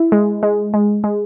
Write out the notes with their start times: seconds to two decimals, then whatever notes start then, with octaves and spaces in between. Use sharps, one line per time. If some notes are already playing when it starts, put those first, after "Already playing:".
Already playing: E4
0.12 G#3
0.43 G#3
0.74 G#3
1.04 G#3